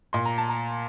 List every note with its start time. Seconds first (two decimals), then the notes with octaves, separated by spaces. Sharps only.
0.13 A#2 C6
0.25 A#5
0.38 A5
0.49 A#5